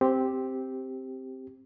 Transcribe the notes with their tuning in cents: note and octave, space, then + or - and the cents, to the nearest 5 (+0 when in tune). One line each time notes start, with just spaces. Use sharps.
C4 +0 G4 +0